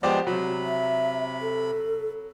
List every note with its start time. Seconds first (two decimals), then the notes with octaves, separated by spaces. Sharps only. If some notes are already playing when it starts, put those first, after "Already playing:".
0.03 F3 G#3 B3 G4 C5 D5
0.27 C3 F#3 B5
0.65 E5
1.42 A4